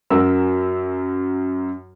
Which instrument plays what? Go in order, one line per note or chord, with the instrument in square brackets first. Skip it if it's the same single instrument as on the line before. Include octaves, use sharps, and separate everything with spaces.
[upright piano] F#2 F#3 A#4 E6